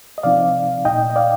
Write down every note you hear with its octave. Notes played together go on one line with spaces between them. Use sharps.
D#5
C3 F3 C4 D#4 D5 F5
A#2 A3 D#4 D#5 G5
D#5
D5 F5